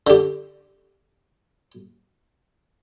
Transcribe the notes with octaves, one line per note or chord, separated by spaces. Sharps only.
D3 G4